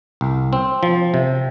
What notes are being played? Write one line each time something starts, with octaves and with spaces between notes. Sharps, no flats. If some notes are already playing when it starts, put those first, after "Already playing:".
C2
C4
F3
C3